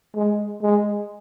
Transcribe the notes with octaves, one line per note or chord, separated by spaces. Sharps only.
G#3
G#3